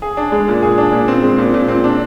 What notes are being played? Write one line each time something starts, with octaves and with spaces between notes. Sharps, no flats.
G#4
D4
G#3
A#2
G#4
D4
A#2
C4
G#3
A#2
A#2
C4
D4